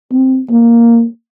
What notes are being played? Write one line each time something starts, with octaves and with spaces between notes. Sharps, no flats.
C4
A#3